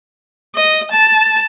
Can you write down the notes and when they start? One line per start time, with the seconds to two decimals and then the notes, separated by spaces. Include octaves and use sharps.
0.56 D#5
0.91 A5